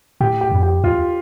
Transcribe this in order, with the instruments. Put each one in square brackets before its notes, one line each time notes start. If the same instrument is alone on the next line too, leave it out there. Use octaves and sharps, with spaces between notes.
[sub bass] A2 [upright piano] G4
[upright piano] G4
[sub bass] F2
[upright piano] G4
[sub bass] E2 [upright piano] F4